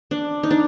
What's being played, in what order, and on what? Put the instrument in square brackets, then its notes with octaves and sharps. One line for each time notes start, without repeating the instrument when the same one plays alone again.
[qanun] D4
D#4
D4